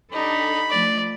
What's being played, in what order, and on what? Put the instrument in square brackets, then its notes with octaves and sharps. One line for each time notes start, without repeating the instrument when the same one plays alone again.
[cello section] D4 G4 A4 [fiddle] D#4 [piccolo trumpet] B5
[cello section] F3 A3 [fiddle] D5